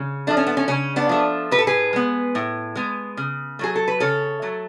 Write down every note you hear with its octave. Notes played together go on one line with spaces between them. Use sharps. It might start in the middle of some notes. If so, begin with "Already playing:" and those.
Already playing: C#3
F3 A3 D4
C#4
B3
C#4
C#3 C#4
B3 D4
F3 A3
A2 B4
A4
G#4 B4
G#3 B3
A2
G#3 B3
C#3
F#3 A3 G#4
A4
B4
C#3 A4 C#5
F#3 A3